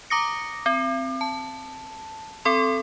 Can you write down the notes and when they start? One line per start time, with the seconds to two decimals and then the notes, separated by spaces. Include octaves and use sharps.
0.10 A#5 D6 D#6 A#6 C#7
0.66 C4
1.21 A5
2.45 C4 A4 C6